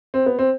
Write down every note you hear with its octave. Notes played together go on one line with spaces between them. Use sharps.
C4
B3
C4